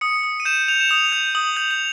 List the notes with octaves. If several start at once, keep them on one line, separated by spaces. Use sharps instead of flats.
D#6 C#7
D#6
D#7
G6 E7
G6 F7
E7
D#6 F7
G6
D#6 F#7
G6
F7